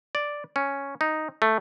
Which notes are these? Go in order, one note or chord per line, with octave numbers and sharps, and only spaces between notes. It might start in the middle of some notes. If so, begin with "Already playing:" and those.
D5
C#4
D#4
A3